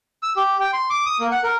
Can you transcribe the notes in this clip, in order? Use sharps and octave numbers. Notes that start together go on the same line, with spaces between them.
E6
G4
G5
C6
D6
D#6
A#3
F#5
A#4